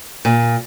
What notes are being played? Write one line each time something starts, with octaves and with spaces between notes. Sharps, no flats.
A#2